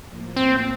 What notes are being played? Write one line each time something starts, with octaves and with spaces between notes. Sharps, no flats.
A2 F3 A#3
C4